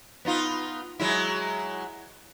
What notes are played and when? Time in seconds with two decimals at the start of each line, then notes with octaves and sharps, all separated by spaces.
0.25 B3 D#4 F4
1.00 F#3 G#3 E4